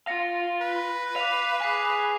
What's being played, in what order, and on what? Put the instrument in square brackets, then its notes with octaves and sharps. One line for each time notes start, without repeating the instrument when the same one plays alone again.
[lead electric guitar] F4 F5 [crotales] A#6 C#7
[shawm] B4
[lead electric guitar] F5 [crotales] D6 D#7 F7
[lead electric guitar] G#4 G#5 [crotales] D6 B6 C7